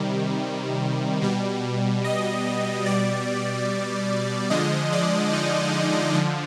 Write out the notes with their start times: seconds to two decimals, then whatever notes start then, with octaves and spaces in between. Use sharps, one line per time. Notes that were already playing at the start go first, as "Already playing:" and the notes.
Already playing: C3 D#3 G3
1.22 B2 G3
2.04 D#5
2.86 B2 G3 D5
4.50 D3 F3 G#3 D#5
4.92 D5
5.33 D#4
6.15 D3 F3